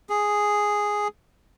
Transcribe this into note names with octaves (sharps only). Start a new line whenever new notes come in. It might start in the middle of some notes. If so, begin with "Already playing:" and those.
G#4